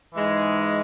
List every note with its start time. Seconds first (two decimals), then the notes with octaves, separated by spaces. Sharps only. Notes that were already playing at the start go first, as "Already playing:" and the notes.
0.14 G#2 E3 G#3 D#4